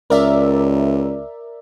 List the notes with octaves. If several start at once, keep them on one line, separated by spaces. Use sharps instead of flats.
C#2 A#4 D5 E5